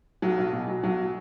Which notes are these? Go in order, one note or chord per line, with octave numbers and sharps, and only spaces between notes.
B1 F#3
B1
B2
F#3
B1 F#3